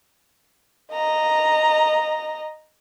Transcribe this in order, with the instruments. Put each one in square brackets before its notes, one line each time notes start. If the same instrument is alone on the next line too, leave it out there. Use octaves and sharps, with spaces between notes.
[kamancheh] D#5 A#5